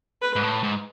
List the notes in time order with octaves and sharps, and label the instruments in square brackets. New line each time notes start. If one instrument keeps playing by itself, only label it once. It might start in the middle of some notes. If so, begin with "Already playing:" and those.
[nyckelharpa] B4
[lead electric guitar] G#2
A2
G#2